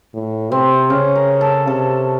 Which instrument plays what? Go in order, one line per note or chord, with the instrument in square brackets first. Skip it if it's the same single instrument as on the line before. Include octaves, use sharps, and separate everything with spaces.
[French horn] A2
[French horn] C3 [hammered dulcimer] C4
[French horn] C#3 [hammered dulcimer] C#4
[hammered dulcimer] A#4
A4
[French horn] C3 [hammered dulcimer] A4